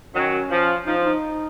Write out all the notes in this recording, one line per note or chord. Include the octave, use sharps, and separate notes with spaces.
D#3 F#3 C#4
F3
F3 D#4
D#4